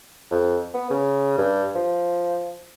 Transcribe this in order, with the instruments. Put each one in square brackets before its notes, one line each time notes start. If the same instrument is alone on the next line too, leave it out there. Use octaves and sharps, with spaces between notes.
[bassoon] F2
B3
C#3
G2
F3